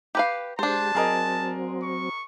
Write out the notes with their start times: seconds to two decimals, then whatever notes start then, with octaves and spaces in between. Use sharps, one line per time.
0.15 G4 B4 F5
0.59 G#3 D4 G4 C5 A5
0.95 F#3 C4 G#4 A#4 D#5
1.83 C#6